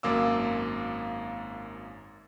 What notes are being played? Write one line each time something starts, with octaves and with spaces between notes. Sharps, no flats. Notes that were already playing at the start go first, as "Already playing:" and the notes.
G#1 F#2 A#3 F5 D6 E6